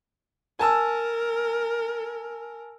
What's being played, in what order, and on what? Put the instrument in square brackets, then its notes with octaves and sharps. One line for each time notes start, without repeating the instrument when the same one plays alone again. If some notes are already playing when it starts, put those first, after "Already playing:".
[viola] A#4 [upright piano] G#5 A5 E6